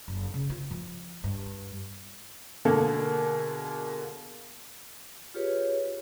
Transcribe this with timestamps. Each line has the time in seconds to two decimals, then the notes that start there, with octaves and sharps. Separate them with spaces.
0.08 F#1
0.34 C#3
0.50 F4
0.71 F3
1.24 G2
2.65 B2 D3 G#3 A#3 G#4 A4
5.34 F4 G4 G#4 B4 C#5